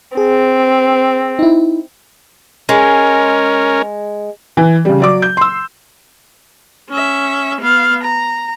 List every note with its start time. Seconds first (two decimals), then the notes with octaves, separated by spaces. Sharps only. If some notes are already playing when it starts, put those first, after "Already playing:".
0.17 C4 G#4
1.39 D#4 E4
2.69 G#3 C#4 A#4
4.57 E3
4.85 C#3 G3
5.00 F#3 D5 D6
5.22 G6
5.37 C6 E6
6.90 C#4 E5
7.61 B3 F5
8.04 A#5